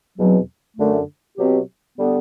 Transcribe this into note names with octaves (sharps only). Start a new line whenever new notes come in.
E2 B2 F#3 C4
F#2 D3 A3
B2 F#3 C4 G4
D3 G3 B3